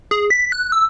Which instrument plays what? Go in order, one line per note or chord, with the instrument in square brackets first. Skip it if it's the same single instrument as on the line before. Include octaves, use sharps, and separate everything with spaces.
[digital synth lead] G#4
B6
F#6
E6